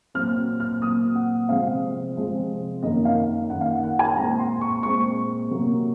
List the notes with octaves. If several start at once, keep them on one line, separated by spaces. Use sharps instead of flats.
A#2 F#3 C4 F6
F6
A#2 F#3 C4 D#6
F#5
C3 F3 G#3 C4 F5
C3 F3 G#3 C4
F#2 D#3 A#3 D#5
F5
F#2 D#3 A#3 F#5
F5
F#5
F#5
G#5
A#2 G#3 C4 A#5
C6
C#6
A#2 G#3 C4 C#6
C3 F#3 A#3